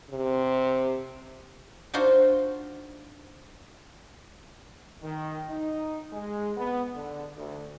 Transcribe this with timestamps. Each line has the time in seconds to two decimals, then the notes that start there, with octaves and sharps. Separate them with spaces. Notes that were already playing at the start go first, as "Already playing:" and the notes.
0.10 C3
1.94 D4 D#4 F4 F#4 C5
5.02 D#3
5.50 D#4
6.12 G#3
6.57 B3
6.95 D3
7.37 D2